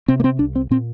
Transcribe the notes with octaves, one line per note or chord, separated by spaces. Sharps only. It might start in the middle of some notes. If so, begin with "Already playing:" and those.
C3 C4
A#3
C4
C2 D4
C4
A#2 C4